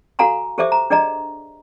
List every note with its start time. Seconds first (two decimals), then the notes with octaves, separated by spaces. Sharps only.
0.19 F#4 A4 F5 G#5 A#5 C6
0.58 G4 A4 C5 E5 D6
0.72 A#5
0.90 D4 G#4 D5 D#5 A#5